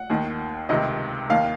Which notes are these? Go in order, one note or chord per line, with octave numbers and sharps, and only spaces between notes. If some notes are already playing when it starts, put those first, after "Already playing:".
Already playing: F#5
D#2 D#3
C#2 C3 D#3 D#5
D#2 D#3 F5